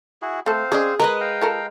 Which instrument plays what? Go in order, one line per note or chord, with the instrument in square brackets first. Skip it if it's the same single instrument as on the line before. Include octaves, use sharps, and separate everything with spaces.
[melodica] E4 F#4 G#4
[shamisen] A3 A4 [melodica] C4 C5 F5
[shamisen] C#4 D5 D#5 [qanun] G#4
[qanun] G#3 B4 D#5 [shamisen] A#4
[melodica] F5 G5 A#5
[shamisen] F4 A4 A#4